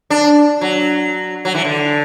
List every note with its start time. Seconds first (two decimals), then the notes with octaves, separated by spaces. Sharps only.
0.10 D4
0.61 F#3
1.45 F#3
1.55 E3
1.64 D3